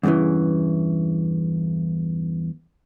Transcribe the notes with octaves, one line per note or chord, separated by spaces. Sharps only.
E2 G2 A#2 C#3 E3